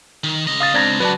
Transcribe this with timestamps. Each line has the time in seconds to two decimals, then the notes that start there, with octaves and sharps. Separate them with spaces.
0.24 D#3
0.48 C#3 D#5
0.60 F5 D#6 A6
0.74 C#2 C4 D4 D5 A#5 G#6 A6
1.00 C#3 F#3 F#4 B4 D5 A5